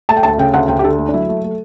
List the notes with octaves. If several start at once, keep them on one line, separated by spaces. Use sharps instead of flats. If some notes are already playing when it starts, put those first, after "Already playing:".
A3 A5
G5
D2 A5
C#3 G5
D2 F#5
D2 G5
G4
D3 A4
A3
D4
F#3 E4
A3
A3